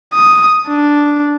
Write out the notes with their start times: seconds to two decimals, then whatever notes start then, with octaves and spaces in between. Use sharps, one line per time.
0.14 D#6
0.68 D4